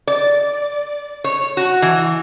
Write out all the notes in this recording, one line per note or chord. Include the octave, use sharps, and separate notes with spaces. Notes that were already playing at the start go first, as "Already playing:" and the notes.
D5
C#5
F#4
E3